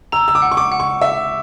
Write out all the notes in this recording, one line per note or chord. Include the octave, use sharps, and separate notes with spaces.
A#5 E6
E6
D6
F#5
C#6
D6
F#5
C#6
E5 E6